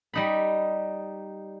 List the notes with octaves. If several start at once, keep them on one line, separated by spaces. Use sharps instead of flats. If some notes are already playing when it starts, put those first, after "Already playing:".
G3 D#4 B5